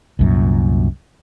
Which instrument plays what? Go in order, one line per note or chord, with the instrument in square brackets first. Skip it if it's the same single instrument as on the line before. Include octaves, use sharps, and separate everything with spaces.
[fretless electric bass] C2 F#2 A#2